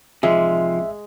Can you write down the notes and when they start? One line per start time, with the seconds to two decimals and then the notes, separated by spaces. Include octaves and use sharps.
0.23 A1 C3 F3 G#3 E5